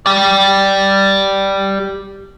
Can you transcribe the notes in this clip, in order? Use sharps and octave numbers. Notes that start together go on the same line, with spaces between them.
G4 D5